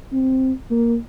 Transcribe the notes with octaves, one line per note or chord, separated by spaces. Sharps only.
C4
A#3